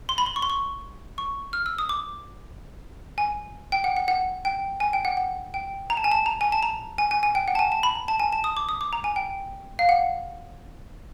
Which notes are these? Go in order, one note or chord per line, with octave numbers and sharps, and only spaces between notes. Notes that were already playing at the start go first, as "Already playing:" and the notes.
C6
B5
C6
C#6
C6
C#6
C#6
F6
E6
D#6
D6
G#5
G5
F#5
F#5
F#5
G5
G#5
G5
F#5
F#5
G5
A#5
A5
G#5
A5
A#5
G#5
A5
A#5
G#5
G#5
G#5
G5
F#5
A5
G#5
A5
B5
A#5
A5
G#5
A5
D#6
D6
D#6
D6
A#5
G#5
G5
F5
F#5